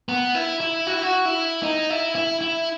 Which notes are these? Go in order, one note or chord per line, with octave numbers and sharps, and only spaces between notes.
B3
E4
E4
F#4
E4
F#4
E4
D#4
E4
E4
E4